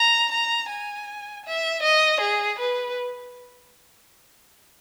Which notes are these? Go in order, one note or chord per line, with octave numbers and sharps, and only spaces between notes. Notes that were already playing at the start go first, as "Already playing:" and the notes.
Already playing: A#5
A#5
G#5
E5
D#5
G#4
B4